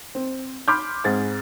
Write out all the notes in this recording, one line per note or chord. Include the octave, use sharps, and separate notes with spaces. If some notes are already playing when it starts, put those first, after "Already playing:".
C4
B5 C6 D6 F6 G6
G#2 C4 G#4 A6